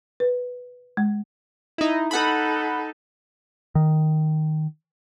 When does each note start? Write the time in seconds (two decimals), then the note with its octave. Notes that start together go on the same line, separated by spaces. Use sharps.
0.20 B4
0.97 G#3
1.78 D#4 E4
2.11 D#4 A4 F#5 B5
3.75 D#3